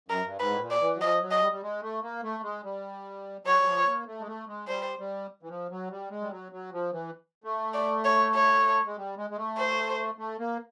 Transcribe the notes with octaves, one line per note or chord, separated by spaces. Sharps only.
F#2 A#4
G2
G#2 B4
A2
A#2
D5
E3
F#3
F3 D#5
F#3
D#5
G3
G3
G#3
A3
A#3
A3
G#3
G3
F#3 C#5
F#3
F3
A#3
A3
G#3
A3
G#3
G3 C5
G3
E3
F3
F#3
G3
G#3
G3
F#3
F#3
F3
E3
A3
D5
C#5
C#5
G#3
G3
G#3
G#3
A3
C5
A3
A#3